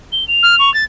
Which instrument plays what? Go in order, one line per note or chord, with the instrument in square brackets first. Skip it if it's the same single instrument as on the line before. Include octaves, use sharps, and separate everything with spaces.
[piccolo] G7
F7
[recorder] F6
C#6
A6